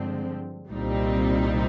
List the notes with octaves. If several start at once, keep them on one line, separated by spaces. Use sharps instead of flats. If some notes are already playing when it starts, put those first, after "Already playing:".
Already playing: G2 D3 F3 G#3 C4
C2 A#2 G3 C4 D#4